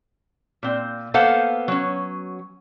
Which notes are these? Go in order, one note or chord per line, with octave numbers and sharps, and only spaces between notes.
A#2 C4
A#3 B3 A4 C5 F5 F#5
F#3 C#4